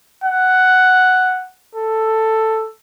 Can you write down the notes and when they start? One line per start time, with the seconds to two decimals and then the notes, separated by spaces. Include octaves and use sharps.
0.24 F#5
1.75 A4